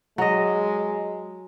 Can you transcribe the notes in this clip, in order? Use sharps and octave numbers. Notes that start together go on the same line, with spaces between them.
F#3 G#3 D#5